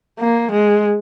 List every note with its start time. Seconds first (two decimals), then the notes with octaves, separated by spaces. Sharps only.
0.20 A#3
0.51 G#3